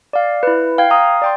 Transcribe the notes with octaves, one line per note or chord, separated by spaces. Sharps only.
D5 F5
E4 B4
F5 G5 G#6
F5 A#5 D#6
D5 G5 C6